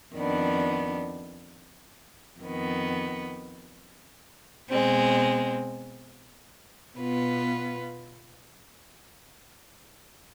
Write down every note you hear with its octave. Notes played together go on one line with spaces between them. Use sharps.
F2 D#3 B3 D4
F2 D#3 B3
B2 G#3 C4
B2 B3 F4 B4